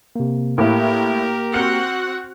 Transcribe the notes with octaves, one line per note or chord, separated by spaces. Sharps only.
C3 A#3
A2 A#3 E4 G4 A#4
C4 F#4 F#5 F6 C#7